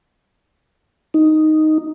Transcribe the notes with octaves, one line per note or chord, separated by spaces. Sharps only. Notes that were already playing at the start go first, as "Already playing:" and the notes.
D#4